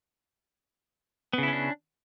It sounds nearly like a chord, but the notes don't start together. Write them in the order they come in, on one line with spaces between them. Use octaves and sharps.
B3 C#3 E4 C#4 D4